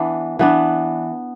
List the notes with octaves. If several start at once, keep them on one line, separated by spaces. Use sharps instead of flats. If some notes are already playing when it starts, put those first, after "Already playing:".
Already playing: E3 B3 D4
E3 B3 D4